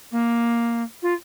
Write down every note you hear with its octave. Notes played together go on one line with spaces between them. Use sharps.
A#3
F4